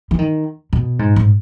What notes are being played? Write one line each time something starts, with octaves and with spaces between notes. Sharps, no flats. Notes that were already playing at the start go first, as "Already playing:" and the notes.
E3
D#3
B2
G#2
G#2